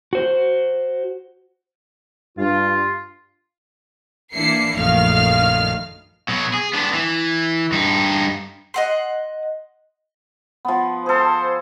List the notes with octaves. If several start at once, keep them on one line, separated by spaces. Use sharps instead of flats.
F#4 C5
G2 F4
E3 A#3 D4 E4 C7 C#7
A#1 F#2 D#3 A3 F5 F6
B2 F#3
G#4
B3 D4
E3
G2 D#4
D#5 F#5 C6
F3 B3
G#4 A4 C5